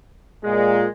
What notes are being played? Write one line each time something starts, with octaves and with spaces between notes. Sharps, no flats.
A#2 G#3